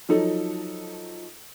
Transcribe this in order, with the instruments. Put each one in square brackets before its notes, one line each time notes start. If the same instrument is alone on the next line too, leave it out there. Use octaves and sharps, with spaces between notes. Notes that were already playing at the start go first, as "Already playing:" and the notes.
[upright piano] F3 F#3 D#4 A4